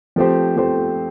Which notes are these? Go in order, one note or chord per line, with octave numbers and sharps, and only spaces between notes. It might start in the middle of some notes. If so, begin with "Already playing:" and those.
F3 A3 C4 G4 C5
F3 A3 C4 G4 C5